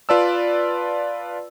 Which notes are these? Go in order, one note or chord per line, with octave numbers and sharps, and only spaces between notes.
F4 B4 D5 A5 E6